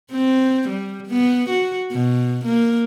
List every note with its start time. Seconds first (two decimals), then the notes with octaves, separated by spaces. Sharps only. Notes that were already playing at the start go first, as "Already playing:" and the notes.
0.11 C4
0.69 G3
1.07 B3
1.50 F#4
1.92 B2
2.45 A#3